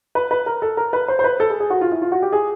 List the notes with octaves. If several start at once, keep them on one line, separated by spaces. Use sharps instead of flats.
B4
B4
A#4
A4
A#4
B4
C5
C5
B4
A4
G#4
G#4
F#4
F4
E4
F4
F#4
G4
G#4